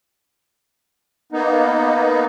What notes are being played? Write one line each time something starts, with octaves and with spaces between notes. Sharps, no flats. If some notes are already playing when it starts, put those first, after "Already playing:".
A#3 B3 D#4